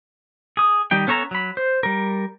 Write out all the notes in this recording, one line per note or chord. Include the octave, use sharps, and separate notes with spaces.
G#4 D#6
D#3 G3 D#4 G5
B3 C#4 A4 C#5 A#5
F#3 B5
C5
G3 A#4